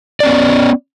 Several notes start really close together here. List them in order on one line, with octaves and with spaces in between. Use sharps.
D5 C#4 B3